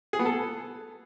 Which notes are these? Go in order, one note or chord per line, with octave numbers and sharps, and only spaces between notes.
G#4
B3
A4